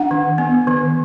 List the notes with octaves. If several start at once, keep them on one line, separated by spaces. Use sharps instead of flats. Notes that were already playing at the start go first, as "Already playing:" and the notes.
Already playing: D4 F#5
D#3
B3
D#3